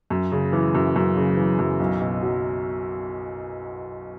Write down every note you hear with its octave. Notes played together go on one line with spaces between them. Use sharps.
F#2
C#3
E3
F#2
F#2
C#3
E3
F#2
B1
B2
F#3